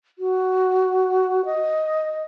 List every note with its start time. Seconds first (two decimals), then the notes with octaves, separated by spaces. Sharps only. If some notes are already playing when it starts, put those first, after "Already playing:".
0.19 F#4
1.45 D#5